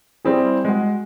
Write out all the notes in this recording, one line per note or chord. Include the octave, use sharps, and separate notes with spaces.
G3 C4 E4 G#4
G#3 F#4